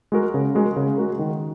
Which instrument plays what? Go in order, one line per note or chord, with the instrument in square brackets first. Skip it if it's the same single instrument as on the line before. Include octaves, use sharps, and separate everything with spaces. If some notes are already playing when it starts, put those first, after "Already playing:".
[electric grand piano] G#3 F#4 A#4
C#3
G#3 F#4 A#4
C#3
G#3 F#4 A#4
D#3